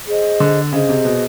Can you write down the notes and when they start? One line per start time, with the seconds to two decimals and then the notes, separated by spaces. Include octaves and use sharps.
0.07 G#4 C5 D#5
0.40 D3
0.73 C#3 G#4 C5 D#5
0.89 C3
1.05 B2